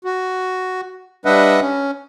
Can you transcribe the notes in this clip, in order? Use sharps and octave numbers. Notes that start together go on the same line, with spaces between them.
F#4
G3 D4 B4 D#5 E5 F#5
C#4